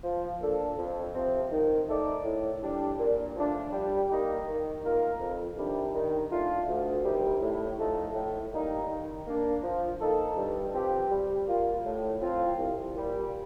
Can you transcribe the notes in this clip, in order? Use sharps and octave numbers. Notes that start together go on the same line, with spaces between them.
F3
A#3 D4 A4
F2
C3 F3 C4
D#3
A3 D#4 A4 D5
A2
G3 D4
A#2
F3 A3 D4
G3
A#3 D#4 G4
D#3
A#3 F4 A#4
F2
C3 D#3 G3 D4
D#3
A3 D4 F4
D2
C3 D#3 G3
A2
F3 A3 D#4 A4
A2
G3 A#3 D#4
D#3
A#3 D4
F3
A#3 D#4 A4
G2
F3 C4 G4
G3
A#3 F4
A2
F3 C4 F4
C2
A#2 G3